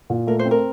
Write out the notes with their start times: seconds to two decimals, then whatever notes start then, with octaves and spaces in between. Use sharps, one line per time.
0.10 A#2
0.27 A3 A#4
0.39 C5
0.45 C4
0.51 A#4